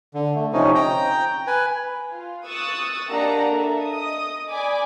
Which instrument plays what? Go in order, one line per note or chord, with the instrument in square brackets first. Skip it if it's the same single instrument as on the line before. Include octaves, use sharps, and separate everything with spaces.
[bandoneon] D3
A3
C3 F3 C#4 D#4
G5 A#5 G6
B4 G#5
[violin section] F4
C#6 D#6 E6 F#6 A6
A#3 D4 G4 D#5 F#5 A#5
A4 E5
D#5 D#6
D5 G#5 B5 D6